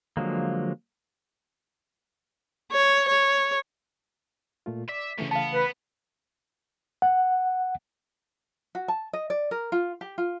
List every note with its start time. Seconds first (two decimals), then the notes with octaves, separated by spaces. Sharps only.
0.17 D3 F3 F#3 G#3 A#3
2.72 C#5
3.08 C#5
4.66 A#2 A3 F4
4.89 D5 E5 D6 B6
5.18 F#2 C#3 E3 A3 C#4
5.31 B3 F5 A5
5.54 B4
7.02 F#5
8.75 F#4
8.88 A5
9.13 D#5
9.30 D5
9.51 A#4
9.72 F4
10.01 G4
10.18 F4